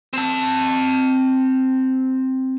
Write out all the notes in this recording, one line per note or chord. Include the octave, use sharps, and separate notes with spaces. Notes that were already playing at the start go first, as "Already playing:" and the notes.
C4 A5